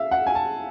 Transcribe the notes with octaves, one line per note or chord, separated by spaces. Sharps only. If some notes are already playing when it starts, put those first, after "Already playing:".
Already playing: E5 F5
F#5
G#5
A5